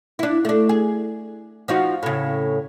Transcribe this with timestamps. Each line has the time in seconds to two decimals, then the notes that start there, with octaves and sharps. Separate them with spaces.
0.19 D4 E4
0.45 A3 D4
0.69 G#4
1.68 F3 D#4 F#4
2.03 A2 C#3